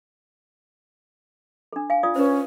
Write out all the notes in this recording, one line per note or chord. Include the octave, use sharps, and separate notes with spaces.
D4 A4
F5 G#5
F4 D5 D#6
C#4 B4 C5